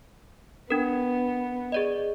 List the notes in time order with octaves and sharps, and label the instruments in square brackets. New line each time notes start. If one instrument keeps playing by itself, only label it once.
[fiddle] B3 [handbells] D4 A#4
[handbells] G#4 D5 D#5